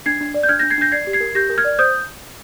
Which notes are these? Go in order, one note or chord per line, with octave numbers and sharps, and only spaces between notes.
D4 G#6 C7
D4
D5
G6
D4 F6 G#6
D4 G6 A#6
G#6 C7
D4 G6 A#6
D5 G#6 C7
G4
G#6 C7
A#4
G4 G6 A#6
A#4
F6 G#6
D5
C5 D#6 G6